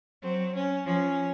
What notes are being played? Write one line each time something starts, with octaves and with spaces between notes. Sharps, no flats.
F#3 C4
C#4
F3 C#4